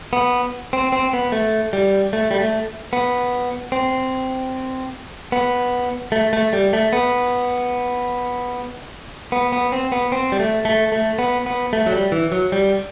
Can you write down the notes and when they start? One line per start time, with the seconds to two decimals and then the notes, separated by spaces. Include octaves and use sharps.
0.13 B3
0.73 C4
0.92 C4
1.13 B3
1.32 A3
1.73 G3
2.13 A3
2.31 G3
2.39 A3
2.93 B3
3.72 C4
5.32 B3
6.12 A3
6.33 A3
6.53 G3
6.73 A3
6.93 B3
9.32 B3
9.52 B3
9.72 C4
9.92 B3
10.12 C4
10.32 G3
10.39 A3
10.65 A3
10.92 A3
11.19 B3
11.46 B3
11.73 A3
11.86 F#3
11.92 G3
12.12 E3
12.32 F#3
12.52 G3